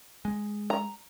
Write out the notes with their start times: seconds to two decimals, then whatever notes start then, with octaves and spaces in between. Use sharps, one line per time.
0.25 G#3
0.70 A#5